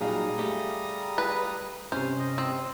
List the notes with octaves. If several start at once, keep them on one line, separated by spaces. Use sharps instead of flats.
A#2 F#3 G3 D#4 G#4 F5 A#5 D#6
A3 G4
B4
G2 C3 C#4 C5
D#5
C4